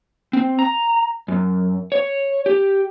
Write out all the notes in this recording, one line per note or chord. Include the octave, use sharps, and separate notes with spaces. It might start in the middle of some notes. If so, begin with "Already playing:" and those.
C4
A#5
F#2
C#5
G4